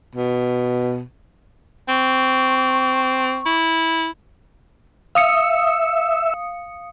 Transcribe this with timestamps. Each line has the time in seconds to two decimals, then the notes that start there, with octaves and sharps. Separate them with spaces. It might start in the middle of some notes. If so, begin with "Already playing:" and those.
0.15 B2
1.89 C4 C#6
3.46 E4
5.15 E5 F5 D#6 C#7